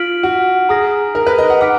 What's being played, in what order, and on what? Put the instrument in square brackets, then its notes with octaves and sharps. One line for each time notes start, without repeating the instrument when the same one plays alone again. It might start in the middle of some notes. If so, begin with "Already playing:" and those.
Already playing: [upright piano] F4 [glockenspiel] F6 B6 D7 F#7
[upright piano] F#4
[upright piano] G#4 [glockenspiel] A#5 D#6 A#6
[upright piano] A#4
B4
D#5
F#5
[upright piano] F#5 [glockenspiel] D6 F6 B6 D7